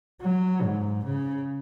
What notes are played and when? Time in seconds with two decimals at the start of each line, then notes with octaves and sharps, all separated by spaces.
0.21 F#3
0.62 G#2
1.04 C#3